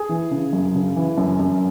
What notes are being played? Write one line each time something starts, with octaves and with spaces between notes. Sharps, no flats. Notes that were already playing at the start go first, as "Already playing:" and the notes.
Already playing: G#4
E3
C#3
F#2
C#3
E3
F#2
F#2